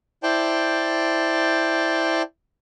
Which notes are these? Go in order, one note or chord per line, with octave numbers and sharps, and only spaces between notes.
E4 C5 D5 G5 A5